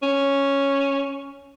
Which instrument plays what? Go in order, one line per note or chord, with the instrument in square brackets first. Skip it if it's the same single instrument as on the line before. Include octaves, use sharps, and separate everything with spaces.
[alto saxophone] C#4